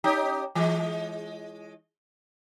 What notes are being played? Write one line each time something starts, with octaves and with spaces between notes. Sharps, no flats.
C#4 D#4 G4
E3 G#3